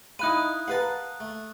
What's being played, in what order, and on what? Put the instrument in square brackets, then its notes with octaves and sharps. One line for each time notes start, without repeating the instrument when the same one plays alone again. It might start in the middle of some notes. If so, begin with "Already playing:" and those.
[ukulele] D#4 B5 [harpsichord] E4 F5 [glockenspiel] D#6 F#6 D#7
[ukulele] A#4 B4 F5 [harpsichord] F#5 A5
[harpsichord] A3